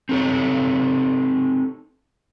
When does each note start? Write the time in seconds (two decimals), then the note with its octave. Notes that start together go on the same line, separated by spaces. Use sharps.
0.09 C4 D#4 A4 C#5